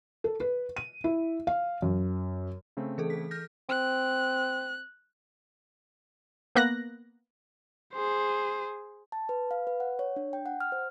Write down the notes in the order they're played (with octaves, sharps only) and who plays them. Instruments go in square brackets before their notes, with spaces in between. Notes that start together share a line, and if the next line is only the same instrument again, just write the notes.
[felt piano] A4
B4
D#7
E4
F5
F#2
[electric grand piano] C#3 A3 C4
[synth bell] E3 G#4 A4
B6
F6 G6 A#6
[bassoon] C4 [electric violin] F#6
[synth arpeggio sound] A#3 B3 F#6 A#6
[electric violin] G#4 C5
[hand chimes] A5
B4
F5
B4
F#5
C#5
D4
G5
F#5
F6
C5